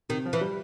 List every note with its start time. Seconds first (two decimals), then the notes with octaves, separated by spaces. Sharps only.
0.09 C3 D#3
0.25 F3
0.33 E3
0.41 G3